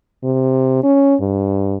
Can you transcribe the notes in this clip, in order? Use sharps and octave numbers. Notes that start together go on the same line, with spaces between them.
C3
C#4
G2